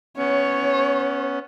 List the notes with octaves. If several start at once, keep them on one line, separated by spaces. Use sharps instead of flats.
B3 C#4 C#5